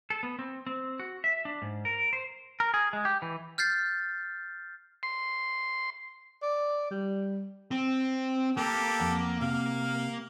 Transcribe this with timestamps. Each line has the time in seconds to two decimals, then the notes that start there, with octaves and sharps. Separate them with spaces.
0.10 A4
0.23 B3
0.39 C4
0.66 C4
0.99 F#4
1.24 E5
1.45 D4
1.62 G#2
1.85 A#4
2.13 C5
2.60 A#4
2.74 G#4
2.93 G#3
3.05 G4
3.22 E3
3.58 F6 G6 A6 C7
5.03 C6
6.43 D5
6.91 G3
7.71 C4
8.57 A#3 G4 A4 A#4
9.00 F2 F#5
9.41 C3 F5